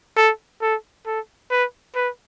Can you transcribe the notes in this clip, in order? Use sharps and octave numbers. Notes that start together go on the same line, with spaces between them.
A4
A4
A4
B4
B4